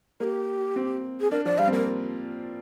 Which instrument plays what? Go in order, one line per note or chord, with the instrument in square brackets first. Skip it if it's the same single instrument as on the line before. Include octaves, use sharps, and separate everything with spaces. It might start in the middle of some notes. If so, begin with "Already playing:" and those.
[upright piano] A#3 [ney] G#4
[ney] G4
[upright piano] C4
[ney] G#4
[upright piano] D4 [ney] A#4
[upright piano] F3 [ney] D5
[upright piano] G3 [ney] F5
[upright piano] C4
[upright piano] A#3 [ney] A#4